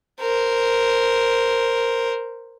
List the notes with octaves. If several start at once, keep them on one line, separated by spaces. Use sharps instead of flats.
A#4 C5